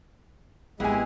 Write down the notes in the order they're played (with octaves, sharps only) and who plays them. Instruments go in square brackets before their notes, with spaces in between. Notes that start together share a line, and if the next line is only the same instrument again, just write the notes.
[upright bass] G#1 A#3 [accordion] G#3 [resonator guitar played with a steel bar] B3 G#5 [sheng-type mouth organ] E4 G4 G#4